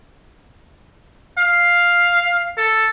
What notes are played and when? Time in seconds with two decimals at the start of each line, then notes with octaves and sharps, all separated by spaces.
1.38 F5
2.57 A4